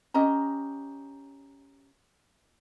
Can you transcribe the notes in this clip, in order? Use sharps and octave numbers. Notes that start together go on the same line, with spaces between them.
C#4 G4 D#5 A#5